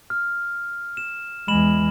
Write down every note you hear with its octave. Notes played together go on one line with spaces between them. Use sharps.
F6
E7
E2 G#3 B5 E7 F#7